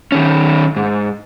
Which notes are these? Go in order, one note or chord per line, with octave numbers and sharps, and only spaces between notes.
D#3 C#4
G#2